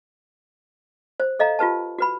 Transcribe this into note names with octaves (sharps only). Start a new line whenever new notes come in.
C5
A4 D#5 F5 A#5
F4 G4 B4 A5
F#4 B4 B5